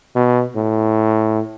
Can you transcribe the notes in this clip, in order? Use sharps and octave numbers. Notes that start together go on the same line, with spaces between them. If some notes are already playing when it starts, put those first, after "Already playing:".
B2
A2